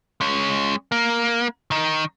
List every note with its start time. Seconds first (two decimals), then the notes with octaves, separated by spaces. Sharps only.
0.21 G#3 C#4
0.92 A#3
1.71 D#3 D#4